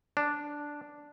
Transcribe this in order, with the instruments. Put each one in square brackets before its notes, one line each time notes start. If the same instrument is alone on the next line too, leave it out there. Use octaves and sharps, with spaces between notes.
[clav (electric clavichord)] D4